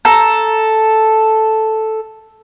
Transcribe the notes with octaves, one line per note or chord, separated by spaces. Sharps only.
A4 A#5